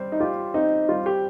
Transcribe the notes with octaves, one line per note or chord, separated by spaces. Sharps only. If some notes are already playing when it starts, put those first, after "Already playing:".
Already playing: G3 C4 C5
D#4
F4 G4
C4 D#4
G3 F4
G4